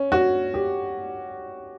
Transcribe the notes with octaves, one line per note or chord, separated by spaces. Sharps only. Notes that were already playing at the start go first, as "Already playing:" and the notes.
Already playing: C#4
F#4
G4